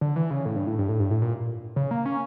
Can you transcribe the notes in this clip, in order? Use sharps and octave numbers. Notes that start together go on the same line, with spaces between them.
D3
E3
C#3
A2
G2
A2
G2
A2
G2
A2
A#2
C#3
A#3
C#4